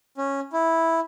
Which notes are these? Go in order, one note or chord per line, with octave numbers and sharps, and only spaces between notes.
C#4
E4